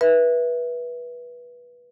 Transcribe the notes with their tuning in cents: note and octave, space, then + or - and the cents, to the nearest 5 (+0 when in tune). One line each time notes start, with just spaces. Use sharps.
B4 -20 E5 +0